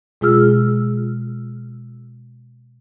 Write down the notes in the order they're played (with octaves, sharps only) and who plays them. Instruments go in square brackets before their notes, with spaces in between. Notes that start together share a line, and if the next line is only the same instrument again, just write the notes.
[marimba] B2 G#3 F4 G#4 E6 F6